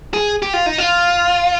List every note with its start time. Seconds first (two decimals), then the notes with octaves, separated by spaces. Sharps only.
0.14 G#4
0.42 G4
0.53 F4
0.66 D#4
0.78 F4